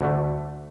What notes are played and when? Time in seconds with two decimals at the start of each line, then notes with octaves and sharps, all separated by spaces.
0.01 D2 D3 A3